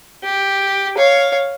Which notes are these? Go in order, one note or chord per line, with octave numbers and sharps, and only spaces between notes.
G4
C#5 F5